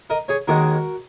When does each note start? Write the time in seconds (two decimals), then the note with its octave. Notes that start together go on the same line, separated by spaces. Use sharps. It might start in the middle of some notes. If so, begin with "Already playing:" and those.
0.10 A#4 D#5
0.28 G#4 C#5
0.48 D#2 D#3 G#3 F#4 A#4